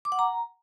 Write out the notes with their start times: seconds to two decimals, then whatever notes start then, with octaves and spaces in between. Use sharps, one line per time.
0.05 D6
0.12 F#5
0.19 A#5